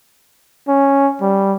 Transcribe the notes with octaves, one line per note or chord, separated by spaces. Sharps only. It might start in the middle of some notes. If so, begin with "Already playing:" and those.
C#4
G3